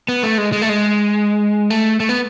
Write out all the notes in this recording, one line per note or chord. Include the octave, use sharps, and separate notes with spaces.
B3
A3
G#3
G#3
A3
G#3
A3
A3
B3